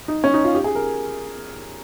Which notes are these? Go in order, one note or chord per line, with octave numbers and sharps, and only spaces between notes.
D#4
C#4
D#4
F4
G4
G#4
A#4